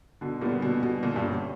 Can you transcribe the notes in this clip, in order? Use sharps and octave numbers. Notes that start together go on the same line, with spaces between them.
B2 D3
A#2 G3 B3
B2 D3
B2 G3 B3
A#2 D3
G2
G3 C#4 F#4